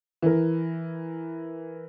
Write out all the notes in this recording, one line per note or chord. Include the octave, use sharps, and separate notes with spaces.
E3 A#4